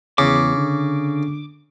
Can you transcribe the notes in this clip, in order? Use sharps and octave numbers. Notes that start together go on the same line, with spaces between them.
E2 C#3 D6
D3